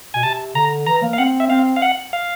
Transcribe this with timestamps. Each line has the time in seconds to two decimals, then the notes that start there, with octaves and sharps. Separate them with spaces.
0.14 B2 G#5
0.23 C3 A5
0.55 D3 A#5
0.87 E3 A#5
1.02 A#3
1.13 F5
1.18 C4 F#5
1.40 E5
1.50 C4 F5
1.76 F5
1.82 F#5
2.13 F5